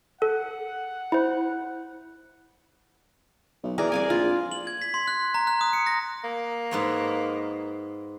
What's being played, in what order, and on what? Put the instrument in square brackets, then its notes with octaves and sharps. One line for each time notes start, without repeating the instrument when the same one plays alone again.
[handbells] A4 [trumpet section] F#5
[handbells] E4 C5
[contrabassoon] B1
[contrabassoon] E3 [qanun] G#4 A#4 D5
[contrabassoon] C2 [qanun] D5 F5 G#5
[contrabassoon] A#1 [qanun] F4
[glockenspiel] F#7
G#6
B6
C6
F#6
A#5
F#6
D#6
C#7
A#6
[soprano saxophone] A#3
[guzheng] G#2 B3 C#5